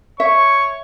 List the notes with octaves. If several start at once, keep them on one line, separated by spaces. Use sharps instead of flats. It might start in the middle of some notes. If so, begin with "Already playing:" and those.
C#5 E5 C#6